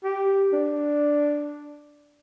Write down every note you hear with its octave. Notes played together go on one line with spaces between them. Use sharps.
G4
D4